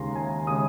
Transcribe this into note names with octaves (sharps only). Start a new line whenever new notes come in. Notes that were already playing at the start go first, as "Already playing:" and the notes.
Already playing: D#2 C#3 G#3 A#5 C6
G#5
C#3 G#3 D#6